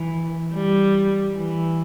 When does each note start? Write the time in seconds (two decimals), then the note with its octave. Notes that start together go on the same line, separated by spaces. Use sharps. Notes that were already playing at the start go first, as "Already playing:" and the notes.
Already playing: E3
0.53 G3
1.34 E3